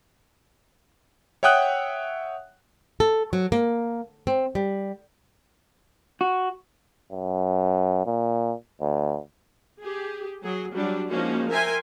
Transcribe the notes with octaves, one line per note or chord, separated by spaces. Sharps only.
C#5 E5 F#5 G5 D#6 F#6
A4
F#3
A#3
C4
G3
F#4
F#2
A#2
D2
G4 G#4
F#3 G#4
F#3 G3 D4
F3 G#3 A#3 C#4 D#4 F#4
A#4 E5 G5 G#5 C6